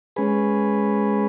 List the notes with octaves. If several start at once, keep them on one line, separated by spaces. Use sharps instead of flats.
G#3 C#4 G#4 B4